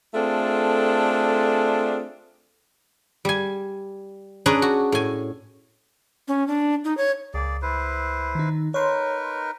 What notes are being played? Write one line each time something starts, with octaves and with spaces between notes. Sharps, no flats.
A3 C4 D4 F4 G#4 A4
G3 G#5
C#4 D4 G#4 B4 D5 A#5
F#4
A2 G#5
C#4
D4
D#4
C#5
C#2 A#3 G#4 D5
E4 B4 C5
D#3 D#4
D#4 A#4 B4 C#5 C6